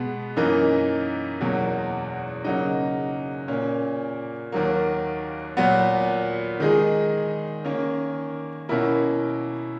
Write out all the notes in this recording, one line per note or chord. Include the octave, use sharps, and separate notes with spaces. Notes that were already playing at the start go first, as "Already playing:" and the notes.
Already playing: B2 G#3 B3
F#2 E3 A#3 D#4 A#4
E2 B2 F#3 A#3
C#3 F#3 A#3 D#4
A#2 A#3 C#4
D#2 D#3 F#3 A#3
A#2 F#3 B3
D#3 G#3 D#4 G#4
D#3 A#3 C#4
B2 A#3 C#4 E4 A#4